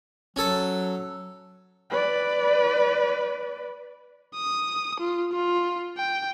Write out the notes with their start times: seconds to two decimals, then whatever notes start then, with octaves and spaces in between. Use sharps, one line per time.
0.36 F#3 C#4 A4
1.90 B4 D5
4.36 D#6
5.00 F4
5.33 F4
5.98 G5